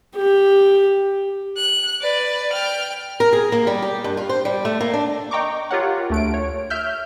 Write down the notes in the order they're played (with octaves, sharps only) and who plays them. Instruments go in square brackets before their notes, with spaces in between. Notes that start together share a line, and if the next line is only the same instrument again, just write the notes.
[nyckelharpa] G4
[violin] F#6
B4 D5
G5 F6
[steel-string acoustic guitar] A#4
G#4
A#3
G3
G4
G2
F4
C5
G3
A3
A#3
D4
[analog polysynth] D#5 G5 A#5 C#6 D6
F4 G4 A#4 C#5 F#5
D2 A3 D7
C#5
E5 F6 G6